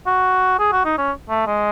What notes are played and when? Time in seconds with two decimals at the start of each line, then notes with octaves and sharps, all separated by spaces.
0.07 F#4
0.59 G#4
0.72 F#4
0.85 D#4
0.98 C#4
1.29 A3
1.47 G#3